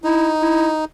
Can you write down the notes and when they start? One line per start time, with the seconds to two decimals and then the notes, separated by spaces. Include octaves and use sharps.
0.03 D#4 E4
0.42 E4